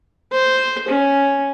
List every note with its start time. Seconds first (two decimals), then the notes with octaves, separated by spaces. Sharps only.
0.32 C5
0.88 C#4